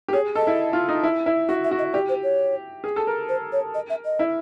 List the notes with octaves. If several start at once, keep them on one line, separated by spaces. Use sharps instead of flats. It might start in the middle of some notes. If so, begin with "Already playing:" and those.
G4
G#4 C#5
A4 D#5
E4
F4
D#4
E4
E4
F#4 E5
E5
F#4
D#5
G4 D5
C5
C#5
G#4
A4
A#4
C5
C#5
D#5
E5
D#5
E4